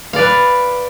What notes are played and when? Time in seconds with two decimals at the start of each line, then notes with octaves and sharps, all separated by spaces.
0.13 F5
0.16 D5
0.19 B4